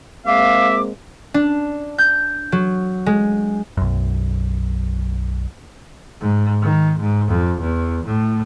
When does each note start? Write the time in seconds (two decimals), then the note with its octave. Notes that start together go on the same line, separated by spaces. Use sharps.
0.26 G#3 A#3 C4 E5 F5 D6
1.34 D4
1.98 G6
2.52 F#3
3.06 G#3
3.77 B1 F#2
6.21 G#2
6.62 D#3
7.00 G#2
7.29 F2
7.61 E2
8.06 A2